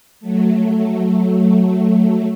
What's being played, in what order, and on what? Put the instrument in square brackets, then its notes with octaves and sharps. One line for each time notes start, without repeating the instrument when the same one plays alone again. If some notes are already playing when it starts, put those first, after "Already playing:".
[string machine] F#3 A3